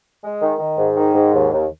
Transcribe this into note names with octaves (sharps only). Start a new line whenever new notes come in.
G#3
D#3
D#3
G#2
D#3
G#2
D#2
D#2